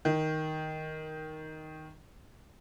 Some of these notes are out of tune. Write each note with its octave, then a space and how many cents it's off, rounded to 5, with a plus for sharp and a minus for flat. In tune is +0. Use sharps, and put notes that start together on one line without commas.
D#3 +5